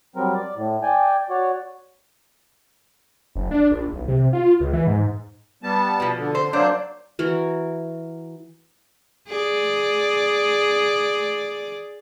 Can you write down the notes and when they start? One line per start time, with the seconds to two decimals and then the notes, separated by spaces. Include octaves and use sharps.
0.16 F#3 G3 C4 A#4
0.34 D5
0.56 A2
0.83 D5 G5 G#5
1.30 F#4 C#5 D5
3.35 F#1
3.51 D4
3.71 A#1
3.93 B1
4.08 C3
4.33 F4
4.60 C#2
4.73 E3
4.87 G#2
5.63 G3 B3 A5
6.00 B2 F3
6.18 D3
6.35 C5
6.53 F#3 A#3 D4 C5
7.19 E3 F#4 A#4
9.28 G#4 D5